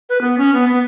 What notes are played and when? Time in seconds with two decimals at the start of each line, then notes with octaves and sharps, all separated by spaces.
0.09 B4
0.21 B3
0.38 C#4
0.54 B3
0.68 B3